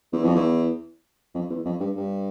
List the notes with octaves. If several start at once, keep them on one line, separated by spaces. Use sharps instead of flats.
E2
F2
E2
F2
E2
F2
G2
G2